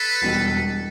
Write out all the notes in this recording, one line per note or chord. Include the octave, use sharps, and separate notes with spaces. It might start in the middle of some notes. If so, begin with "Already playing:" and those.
Already playing: A4 B4
E1 E2 B2 G3